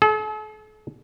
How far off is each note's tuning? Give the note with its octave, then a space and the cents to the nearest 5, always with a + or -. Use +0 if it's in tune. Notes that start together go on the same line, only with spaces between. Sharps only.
A4 -45